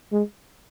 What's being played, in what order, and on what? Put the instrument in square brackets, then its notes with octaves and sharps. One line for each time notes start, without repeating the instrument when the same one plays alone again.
[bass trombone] G#3